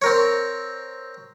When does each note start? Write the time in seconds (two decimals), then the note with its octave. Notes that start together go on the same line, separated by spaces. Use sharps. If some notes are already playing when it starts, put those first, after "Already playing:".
0.02 C4 A#4 C#5